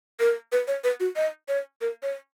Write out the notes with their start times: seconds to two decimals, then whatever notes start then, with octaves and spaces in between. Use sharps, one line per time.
0.20 A#4
0.52 B4
0.68 C#5
0.84 B4
1.00 F#4
1.16 D#5
1.48 C#5
1.81 A#4
2.03 C#5